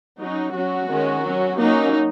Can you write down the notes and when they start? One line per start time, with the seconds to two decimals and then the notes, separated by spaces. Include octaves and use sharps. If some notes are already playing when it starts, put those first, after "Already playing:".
0.20 F#3 C#4 D#4
0.54 F#3 C#4 F#4
0.90 D#3 G#3 C#4
1.24 F#3 C#4
1.59 F#3 A#3 C#4 D#4